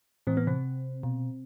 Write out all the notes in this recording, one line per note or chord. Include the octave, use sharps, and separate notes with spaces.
A2 E3 C4
B3
C3 C4
B2